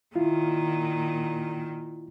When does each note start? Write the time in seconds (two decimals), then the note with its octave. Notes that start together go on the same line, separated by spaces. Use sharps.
0.15 A#2 D#3 E4 F4